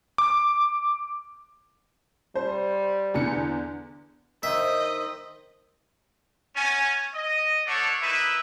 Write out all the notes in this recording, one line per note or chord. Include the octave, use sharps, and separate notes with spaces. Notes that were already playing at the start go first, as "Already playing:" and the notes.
D6
G3 C5
E2 D3 C#7
D#3 D#4 C5 D#5 E5
B3 C#4 G#5
D#5
A3 D4 A4 C#5 D5 F#5
D#4 E4 A#4 B4 E5